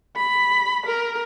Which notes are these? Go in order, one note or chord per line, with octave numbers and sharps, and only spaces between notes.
B5
A#4